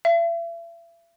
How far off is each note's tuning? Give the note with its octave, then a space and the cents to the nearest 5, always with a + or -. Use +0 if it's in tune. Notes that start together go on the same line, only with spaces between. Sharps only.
E5 +40